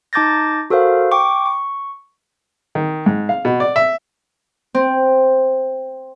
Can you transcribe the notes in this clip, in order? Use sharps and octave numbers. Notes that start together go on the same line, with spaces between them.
D#4 A5 D6 G6 A6 A#6
F#4 A4 A#4 C5 F5
G5 C#6 D6
C#6
D#3
G#2
F5
B2
D5
E5
C4